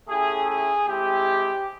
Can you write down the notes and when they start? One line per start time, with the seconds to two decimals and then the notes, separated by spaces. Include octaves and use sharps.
0.09 A3 C#4 E4 G4 G#4
0.48 G#4
0.88 G#3 C4 E4 G4